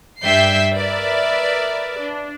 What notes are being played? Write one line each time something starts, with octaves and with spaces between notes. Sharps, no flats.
G2 D5 E5 G5 G6 C7
A#4 B4 D5 E5
D4